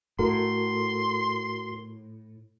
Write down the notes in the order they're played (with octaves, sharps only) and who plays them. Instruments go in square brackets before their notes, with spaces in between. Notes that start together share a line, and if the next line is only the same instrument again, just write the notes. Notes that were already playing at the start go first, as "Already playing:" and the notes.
[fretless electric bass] A2 [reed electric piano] F#4 A4 A#4 [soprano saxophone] C6